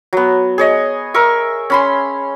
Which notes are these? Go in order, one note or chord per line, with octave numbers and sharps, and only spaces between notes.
F#3 B3
G#4 C#5 D#5
A#4 E5 C#6
C#4 B5 C6